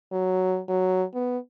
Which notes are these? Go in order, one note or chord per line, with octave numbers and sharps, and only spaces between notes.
F#3
F#3
B3